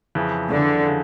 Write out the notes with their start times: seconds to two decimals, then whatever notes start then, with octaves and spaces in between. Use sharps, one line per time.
0.15 F2 C#3 E3
0.51 D3
0.87 C#3